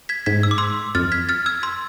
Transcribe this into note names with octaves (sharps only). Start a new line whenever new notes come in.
G#6 B6
G#2 G#6 B6
E6
D6
C6 E6
F2 F6 A6
G#6 B6
F6 A6
E6 G#6
C6 E6